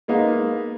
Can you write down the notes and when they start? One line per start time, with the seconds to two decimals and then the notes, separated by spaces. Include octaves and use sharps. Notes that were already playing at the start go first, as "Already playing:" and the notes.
0.08 G#3 A#3 B3 D#4